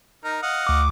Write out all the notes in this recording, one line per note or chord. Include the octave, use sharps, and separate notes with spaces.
D#4 A#4
D#5 F5 F#5
D2 D6